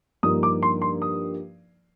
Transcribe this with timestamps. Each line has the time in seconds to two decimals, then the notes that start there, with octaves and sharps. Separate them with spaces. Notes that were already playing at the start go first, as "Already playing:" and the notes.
0.23 G2 F3 A#3 D#4 D#6
0.43 D6
0.63 C6
0.82 C6
1.02 D#6